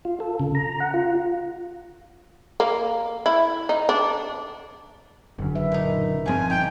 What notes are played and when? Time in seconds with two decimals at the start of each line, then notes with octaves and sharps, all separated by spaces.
0.05 F4
0.20 A4
0.40 C#3
0.55 A#5
0.80 F#5
0.94 F4
2.60 A#3
3.26 E4
3.69 D#4
3.89 D4
5.39 F#1 F#2 D3
5.55 B4 E5
5.72 A#2 D#4
6.26 G1 C#3 F3 C4 G#5
6.50 D#4 G5